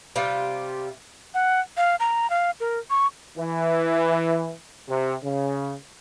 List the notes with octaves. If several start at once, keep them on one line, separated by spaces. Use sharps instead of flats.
C3 G3 F4
F#5
F5
A#5
F5
A#4
C#6
E3
C3
C#3